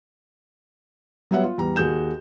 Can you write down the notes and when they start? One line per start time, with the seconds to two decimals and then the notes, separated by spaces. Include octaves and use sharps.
1.31 F#3 G3 B3 C#5 E5 F#5
1.44 F4
1.58 E2 G3 A#5
1.76 D#2 F#4 G#4 G6 E7